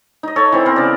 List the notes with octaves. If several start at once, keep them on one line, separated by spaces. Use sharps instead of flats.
D#4 D#5
A4 C#5
E3 C4
B3 C4 A#4
C#3 D5